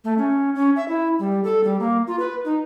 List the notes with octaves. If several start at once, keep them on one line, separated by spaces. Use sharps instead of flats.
A3
C#4
C#4
E5
E4
G3
A4
G3
A#3
F4
B4
D#4